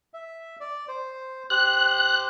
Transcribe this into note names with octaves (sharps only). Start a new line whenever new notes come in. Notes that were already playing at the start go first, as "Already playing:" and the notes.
E5
D5
C5
G4 C5 F#6